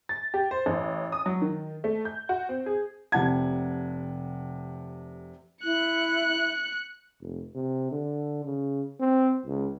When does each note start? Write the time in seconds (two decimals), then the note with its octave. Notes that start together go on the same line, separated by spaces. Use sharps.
0.09 A6
0.34 G4
0.51 C5
0.66 A1
1.12 D#6
1.26 F#3
1.42 D#3
1.84 A3
2.05 G6
2.29 F#4
2.49 C4
2.66 G#4
3.12 F1 C3 F#5 A5 G#6
5.64 E4 F#6 C#7
7.21 F1
7.55 C3
7.92 D3
8.45 C#3
9.00 C4
9.46 C#2